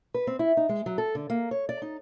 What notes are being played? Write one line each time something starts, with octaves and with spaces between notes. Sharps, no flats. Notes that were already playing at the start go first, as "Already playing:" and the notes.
B4
C4
E4
D#4
G#3
F#3
A4
D3
A#3
C#5
D5
D#4